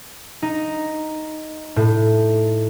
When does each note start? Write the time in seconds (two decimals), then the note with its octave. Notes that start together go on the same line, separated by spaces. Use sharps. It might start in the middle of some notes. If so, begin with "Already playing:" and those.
0.42 D#4
1.76 A2